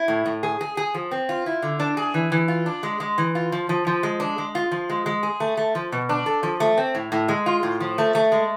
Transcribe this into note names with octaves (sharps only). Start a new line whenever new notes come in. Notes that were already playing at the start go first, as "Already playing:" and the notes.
Already playing: E4
A2
A2
G#4
G#4
G#4
F3
C4
F4
E4
D3
D4
G#4
E3
E3
F4
D4
G#3
G#3
E3
F4
F3
F3
F3
G#3
D4
G#3
F4
F3
G#3
G#3
G#4
A3
A3
F3
B2
D4
A4
F3
A3
C4
A2
A2
G#3
F4
A2
F3
A3
A3
G#3